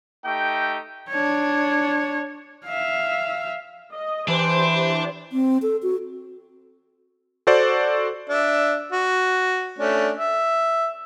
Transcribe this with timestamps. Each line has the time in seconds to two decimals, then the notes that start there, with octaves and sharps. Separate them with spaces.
0.25 A3 D#4 G4 G5
1.10 D4 C#5
2.66 E5 F5
3.92 D#5
4.28 E3 D4 G4 C5 C6
5.32 C4
5.62 A4
5.83 F#4
7.47 F#4 A4 C5 D5
8.29 D4 E5
8.92 F#4
9.79 A3 C#4 D4
10.17 E5